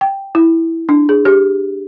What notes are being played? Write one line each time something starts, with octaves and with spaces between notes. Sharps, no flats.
G5
E4
D4
G#4
G4